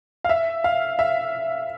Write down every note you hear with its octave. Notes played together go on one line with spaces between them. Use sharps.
F5
E5
F5
E5